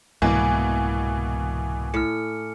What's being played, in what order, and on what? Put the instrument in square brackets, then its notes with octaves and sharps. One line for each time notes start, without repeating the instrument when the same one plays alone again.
[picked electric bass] C2 G#2 G#3 [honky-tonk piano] B2 E3 [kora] A#3 [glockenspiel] G#5 D6
[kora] A2 [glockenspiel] F6 C#7